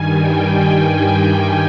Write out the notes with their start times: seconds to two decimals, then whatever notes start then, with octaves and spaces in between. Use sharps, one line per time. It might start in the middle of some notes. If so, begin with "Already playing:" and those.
Already playing: G2 D#3 G3 G#5
0.14 G5